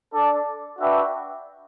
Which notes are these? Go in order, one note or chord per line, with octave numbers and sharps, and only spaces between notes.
D4 A4 D5
D4 F#4 B4 E5 G5